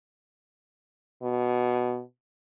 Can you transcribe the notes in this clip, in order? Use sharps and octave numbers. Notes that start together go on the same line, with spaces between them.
B2